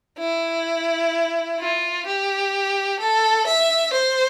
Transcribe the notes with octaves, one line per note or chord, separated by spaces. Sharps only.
E4
F4
G4
A4
E5
C5